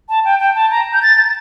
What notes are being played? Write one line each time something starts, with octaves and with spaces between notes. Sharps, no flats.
A5
G5
G5
A5
A#5
G6
A6
A6